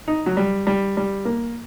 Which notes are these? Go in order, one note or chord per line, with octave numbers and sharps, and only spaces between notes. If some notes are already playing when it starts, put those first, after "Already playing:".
D#4
F#3
G3
G3
G3
A#3